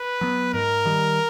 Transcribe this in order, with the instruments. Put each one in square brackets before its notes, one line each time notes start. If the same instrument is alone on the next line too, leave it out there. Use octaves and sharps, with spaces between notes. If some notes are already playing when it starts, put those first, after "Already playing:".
Already playing: [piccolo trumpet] B4
[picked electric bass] F#3 B3
[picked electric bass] G#2 [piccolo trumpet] A#4
[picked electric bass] D#3 G3